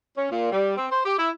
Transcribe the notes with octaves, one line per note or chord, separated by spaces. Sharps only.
C#4
A#2
G3
C4
C5
G4
E4